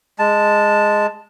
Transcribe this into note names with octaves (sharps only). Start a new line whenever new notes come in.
G#3 A5